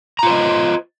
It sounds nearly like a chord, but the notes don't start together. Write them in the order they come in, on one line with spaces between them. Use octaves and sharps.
A#5 F4 C5 D#5